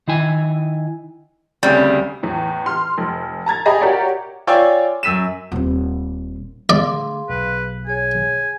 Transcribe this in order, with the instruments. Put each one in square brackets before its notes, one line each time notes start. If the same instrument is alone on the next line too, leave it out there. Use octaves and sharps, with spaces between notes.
[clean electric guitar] D#3 E4 G#5
[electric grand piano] D2 C#3 C4 [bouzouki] G3
[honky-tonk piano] E2 A2
C6 F6
F1
A5 A#5 G#6 A6
G4 G#4 D#5 A#5 B5
F#4 G4 A#4 C#5 D5 E5
[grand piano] F4 C#5 D5 G5 G#5 E6
F#2 E6 B6 D#7 E7
[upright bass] D#1 C4
[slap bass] D3 A3 [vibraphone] G#4 F5 C6 [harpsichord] D5
[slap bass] B1 [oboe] B4
[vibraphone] G#4 C#5 [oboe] G#5